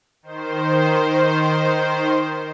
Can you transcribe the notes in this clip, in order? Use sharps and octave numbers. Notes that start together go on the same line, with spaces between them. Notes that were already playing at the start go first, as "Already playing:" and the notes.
D#3 C5